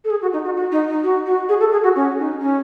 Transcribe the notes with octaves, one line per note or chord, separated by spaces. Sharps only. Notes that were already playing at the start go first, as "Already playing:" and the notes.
A4
G#4
F#4
D#4
F#4
F#4
D#4
D#4
F#4
F#4
G#4
A4
G#4
F#4
C#4
D#4
C#4